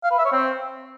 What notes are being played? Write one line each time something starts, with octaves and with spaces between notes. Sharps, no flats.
F5
B4
E5
C#5
C4